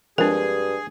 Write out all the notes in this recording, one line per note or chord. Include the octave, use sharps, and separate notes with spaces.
G2 F3 G#3 C4 D4 G#4 A#4